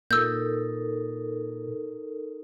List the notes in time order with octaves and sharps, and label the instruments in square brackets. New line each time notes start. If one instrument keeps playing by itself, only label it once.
[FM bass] A#2 [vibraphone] D#4 A4 A#4 [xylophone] E6 G6